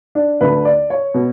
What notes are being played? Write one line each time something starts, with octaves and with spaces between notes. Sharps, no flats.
D4
D2 D3 B4
D5
C#5
B2